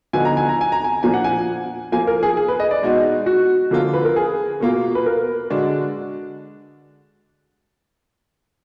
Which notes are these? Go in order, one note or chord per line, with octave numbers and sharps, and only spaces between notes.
D3 F3 B3 D#4 F#4 G#5
A#5
G#5
A#5
G#5
A#5
G#5
A#2 F3 A#3 D4 G#5
F#5
G#5
F3 A#3 F4 G#5
A#4
G#4
G#4
B4
D#5
D5
B2 G#3 D#4 F#4
F#4
D3 F3 A#3 F4
B4
A#4
G#4
B2 A#3 F4
B4
A#4
D3 G#3 D4 F#4